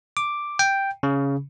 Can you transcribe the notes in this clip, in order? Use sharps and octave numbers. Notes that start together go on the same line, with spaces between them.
D6
G5
C#3